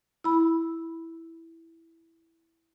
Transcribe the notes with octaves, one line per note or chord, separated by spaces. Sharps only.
E4 B5